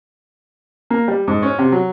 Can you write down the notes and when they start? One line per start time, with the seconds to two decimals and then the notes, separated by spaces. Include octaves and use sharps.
0.90 A#3
1.08 G3
1.28 G#2
1.42 C#4
1.59 C3
1.72 F#3